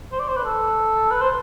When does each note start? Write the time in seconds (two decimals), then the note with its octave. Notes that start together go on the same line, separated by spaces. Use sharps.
0.12 C5
0.19 D5
0.28 C5
0.37 B4
0.44 A4
1.11 B4
1.21 C5